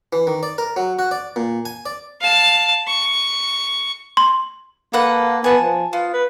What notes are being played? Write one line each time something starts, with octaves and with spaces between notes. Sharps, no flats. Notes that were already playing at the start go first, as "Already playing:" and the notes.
E3
D#3
D5
A#4
F#3
F#4
D5
A#2
G#5
D5
F5 A5
C#6
C6
A#3 A4 B4 F#5
B3 G#5 A5
F3
B3 F4
B4